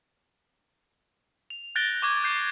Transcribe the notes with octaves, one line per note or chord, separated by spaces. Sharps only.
F7
F#6 G6 A6 A#6 D7 G7
C#6 D6 G#6 G7
F#6 G6 C7